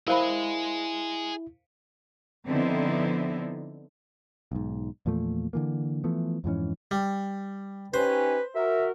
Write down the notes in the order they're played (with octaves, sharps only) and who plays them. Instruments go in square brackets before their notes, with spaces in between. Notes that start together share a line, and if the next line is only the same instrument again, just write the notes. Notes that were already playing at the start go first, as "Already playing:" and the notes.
[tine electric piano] E4 [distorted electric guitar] G#4 D#5 [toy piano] A#4 C5 B5 [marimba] F5
[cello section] D3 F3 B3 C4 D#4 E4
[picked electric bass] B1 G#2
E2 A#2 F3 A3
D3 E3 A#3
E3 F3 A3 B3
F2 G#2 E3 C#4
[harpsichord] G3
[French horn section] C#4 D#4 G4 [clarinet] B4 [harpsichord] C5
[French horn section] F#4 A#4 [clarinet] E5